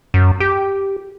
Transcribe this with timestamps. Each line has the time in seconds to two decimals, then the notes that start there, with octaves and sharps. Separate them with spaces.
0.14 F#2
0.40 G4